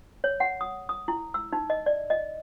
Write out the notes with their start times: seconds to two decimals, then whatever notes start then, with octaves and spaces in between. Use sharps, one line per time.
0.24 C#5
0.40 F#5
0.61 D#6
0.89 D#6
1.08 E4
1.34 E6
1.52 D#4
1.70 D#5
1.86 D5
2.10 D#5